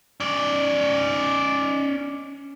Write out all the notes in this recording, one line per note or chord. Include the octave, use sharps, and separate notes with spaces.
C#4 D5